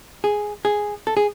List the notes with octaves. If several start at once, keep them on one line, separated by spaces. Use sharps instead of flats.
G#4
G#4
A4
G#4